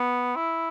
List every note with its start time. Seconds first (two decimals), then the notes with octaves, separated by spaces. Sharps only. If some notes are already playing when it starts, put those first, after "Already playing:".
Already playing: B3
0.36 E4